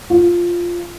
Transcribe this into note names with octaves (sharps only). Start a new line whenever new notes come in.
F4